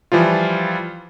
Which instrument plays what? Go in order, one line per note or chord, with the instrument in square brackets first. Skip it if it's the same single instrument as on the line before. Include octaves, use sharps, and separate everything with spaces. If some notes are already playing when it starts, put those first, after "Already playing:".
[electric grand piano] E3 F3 G3 F4